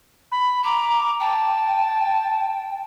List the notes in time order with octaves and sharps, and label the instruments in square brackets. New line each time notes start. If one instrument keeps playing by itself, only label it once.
[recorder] B5
[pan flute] A#5 [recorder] D6
[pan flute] G5 [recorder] A5